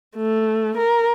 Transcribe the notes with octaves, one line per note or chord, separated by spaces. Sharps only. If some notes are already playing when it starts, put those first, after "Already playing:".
A3
A#4